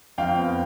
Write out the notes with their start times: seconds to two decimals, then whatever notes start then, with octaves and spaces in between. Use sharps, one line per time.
0.18 F2 F5 G5
0.38 B3